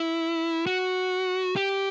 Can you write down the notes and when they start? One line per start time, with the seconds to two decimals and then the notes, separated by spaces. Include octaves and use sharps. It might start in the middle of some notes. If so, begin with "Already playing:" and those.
Already playing: E4
0.66 F#4
1.56 G4